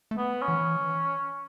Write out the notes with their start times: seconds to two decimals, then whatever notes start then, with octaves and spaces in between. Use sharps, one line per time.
0.11 A3
0.17 B3
0.42 C#4
0.48 E3